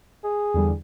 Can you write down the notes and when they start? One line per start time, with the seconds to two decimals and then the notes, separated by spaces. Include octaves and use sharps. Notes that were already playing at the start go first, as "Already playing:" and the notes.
0.24 G#4
0.54 E2 D3 G3